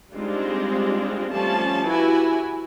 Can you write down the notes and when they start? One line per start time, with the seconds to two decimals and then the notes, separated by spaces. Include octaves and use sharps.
0.13 G3 G#3 C4 D4 D#4 F4
1.32 F3 G3 A3 C#4 A5
1.84 E4 F#4 G4 B4 G#5